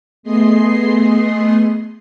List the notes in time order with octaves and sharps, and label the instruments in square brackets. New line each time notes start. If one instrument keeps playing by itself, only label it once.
[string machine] A3 B3 G#4 D#5 C6 C7